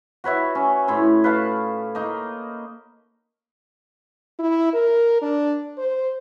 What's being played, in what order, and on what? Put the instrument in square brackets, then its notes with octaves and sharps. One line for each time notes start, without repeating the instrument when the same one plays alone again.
[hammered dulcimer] F#4 B4 C#5 E5
C#4
A2 E4 C#5 C6
B4 F5 A5
A#3 D#4
[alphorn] E4
A#4
D4
C5